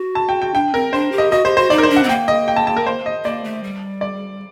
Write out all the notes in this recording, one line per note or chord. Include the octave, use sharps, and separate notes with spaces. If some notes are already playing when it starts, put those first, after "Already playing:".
Already playing: F#4
A5
G5
G5
D4 G5
C4 A#4
D4 C5
G4
D#5
F#4 D#5
G4 C5
F#4 C5
D#4 D5
A#4
C5
D4
F#5
C4
A#3 G5
D#5
G5
A5
A5
A#4
C5
D#5
A#3 D5
A3
G3
D5